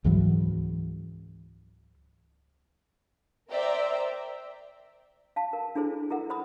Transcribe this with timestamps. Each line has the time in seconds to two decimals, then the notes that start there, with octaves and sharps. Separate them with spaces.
0.04 C#2 G#2 E3 F#3
3.49 A#4 C5 D5 E5 G5 A#5
5.36 F5 A5
5.53 A#4
5.75 D4 E4 G#4 A4 C5
6.10 E4 A4 A#4 F#5
6.30 C5 B5 D#6